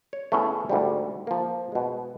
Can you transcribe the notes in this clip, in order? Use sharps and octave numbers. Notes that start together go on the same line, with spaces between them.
C#5
A3 B3 C#4 E4 G#4
D2 G#2 G3
F3 A#3
B2 G#3